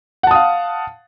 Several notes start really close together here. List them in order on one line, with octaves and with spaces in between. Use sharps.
F#5 A5 D#6 F5